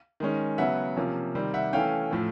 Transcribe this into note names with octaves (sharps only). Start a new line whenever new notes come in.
D#3 G#3 C#4
C#3 F#3 B3 E5 F#5
C3 F3 A#3 C#4
C3 D#3 G3 C4
E5 F#5
E3 A3 C#4 F5 G5
A2 F3 A3